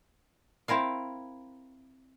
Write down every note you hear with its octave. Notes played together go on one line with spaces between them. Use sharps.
C4 E4 A#4 F5